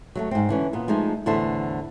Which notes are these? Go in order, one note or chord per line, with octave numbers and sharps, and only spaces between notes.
F#3 G#3 A3
G#2 C4
D3 E3 C#4
A#2 B3
F3 G#3 A3 D#4
E2 A2 D3 A4 C5 E5